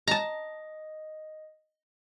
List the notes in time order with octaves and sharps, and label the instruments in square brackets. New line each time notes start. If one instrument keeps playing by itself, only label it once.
[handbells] D#5 [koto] A5 A#5